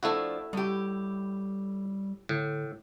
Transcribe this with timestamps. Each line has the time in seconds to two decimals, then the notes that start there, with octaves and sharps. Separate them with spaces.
0.03 F3 A3 D4 E4 F#4
0.53 A2 G3 G4
2.29 A2 D3